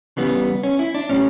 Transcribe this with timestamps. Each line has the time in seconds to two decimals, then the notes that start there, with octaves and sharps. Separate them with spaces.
0.17 C#3 E3 G3 B3
0.63 C#4
0.79 E4
0.94 D4
1.09 A2 G3 C#4